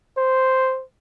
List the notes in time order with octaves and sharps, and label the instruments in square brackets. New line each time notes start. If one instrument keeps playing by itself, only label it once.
[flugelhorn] C5